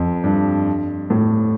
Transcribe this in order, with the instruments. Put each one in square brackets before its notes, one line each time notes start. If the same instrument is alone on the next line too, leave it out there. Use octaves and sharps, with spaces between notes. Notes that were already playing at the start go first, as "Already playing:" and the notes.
Already playing: [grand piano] F2
G2
A2